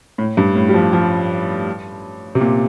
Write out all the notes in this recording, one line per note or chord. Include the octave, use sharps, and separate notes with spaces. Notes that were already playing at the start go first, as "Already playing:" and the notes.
A2
G2
A2
G3
F3
F3
C3
A#2